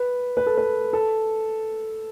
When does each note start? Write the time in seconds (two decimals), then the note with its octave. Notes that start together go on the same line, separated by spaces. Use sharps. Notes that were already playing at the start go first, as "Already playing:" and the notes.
Already playing: B4
0.37 B4
0.46 A4
0.57 B4
0.93 A4